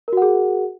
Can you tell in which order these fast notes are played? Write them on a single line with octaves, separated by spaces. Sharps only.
A#4 F#4 F#5 G#4